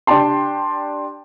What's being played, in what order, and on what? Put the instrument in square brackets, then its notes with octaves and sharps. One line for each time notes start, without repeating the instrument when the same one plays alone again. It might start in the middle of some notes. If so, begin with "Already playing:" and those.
[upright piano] D4 G4 G5 A5 C6